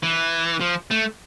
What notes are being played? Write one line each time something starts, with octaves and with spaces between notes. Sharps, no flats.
E3
F3
A3